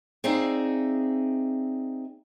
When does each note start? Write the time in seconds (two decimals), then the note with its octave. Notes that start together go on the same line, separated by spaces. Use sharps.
0.24 C4 D#4 G#4 D5 E5 F5